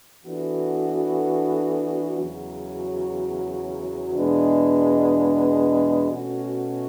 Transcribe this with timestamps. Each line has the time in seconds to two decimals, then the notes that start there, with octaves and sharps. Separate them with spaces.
0.24 E3 B3 D4 F#4 A4
2.19 E2 C#3 F#3
4.15 E2 B2 G#3 B3 D4
6.09 B2 A3 C#4 F#4